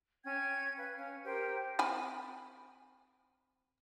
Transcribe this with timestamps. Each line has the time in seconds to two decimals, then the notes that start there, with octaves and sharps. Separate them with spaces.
0.25 C#4 G5 G#6
0.77 B4 F5
0.98 C#4
1.24 G4 A#4 C5 G5
1.79 C4 G#5 B5